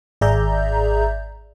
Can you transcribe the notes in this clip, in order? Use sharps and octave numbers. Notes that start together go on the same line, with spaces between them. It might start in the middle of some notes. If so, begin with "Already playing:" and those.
G#1 G#4 D5 E5 A#5 G6